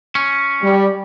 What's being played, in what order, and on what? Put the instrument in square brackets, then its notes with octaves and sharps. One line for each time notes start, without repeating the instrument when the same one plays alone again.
[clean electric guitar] C#4
[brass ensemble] G3